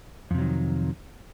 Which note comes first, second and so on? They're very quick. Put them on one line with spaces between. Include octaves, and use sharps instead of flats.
F2 C3 F#3 D#3